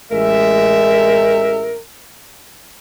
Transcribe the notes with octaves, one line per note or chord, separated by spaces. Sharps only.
A1 G#3 A#4 E5